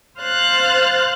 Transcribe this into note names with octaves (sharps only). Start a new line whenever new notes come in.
C5 F5 F6 F#6 A6